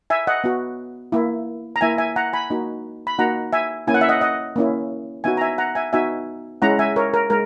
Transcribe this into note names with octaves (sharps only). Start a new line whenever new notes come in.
E5 G#5
D#5 F#5
B3 F#4
A#3 E4
A#5
A#3 E4 E5 G#5
E5 G#5
F#5 A#5
G#5 B5
A#3 D#4 F#4
B5
A#3 D#4 F#4 F#5 A#5
E5 G#5
A#3 C#4 E4 G#5
F#5
E5
D#5 F#5
D#5 F#5
A#3 C#4 E4
B3 D#4 F#4 E5 G#5
A#5
E5 G#5
F#5 A#5
E5 G#5
B3 D#4 F#4 E5 G#5
G#3 C#4 E4 F#5 A#5
E5 G#5
A#4 C#5
A#4
G#3 A#4